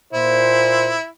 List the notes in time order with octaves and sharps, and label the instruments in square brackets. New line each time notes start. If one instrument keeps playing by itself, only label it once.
[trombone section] A#2 C5 [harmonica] E4